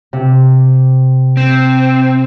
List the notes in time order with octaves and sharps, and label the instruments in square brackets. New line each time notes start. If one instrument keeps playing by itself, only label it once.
[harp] C3
[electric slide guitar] C4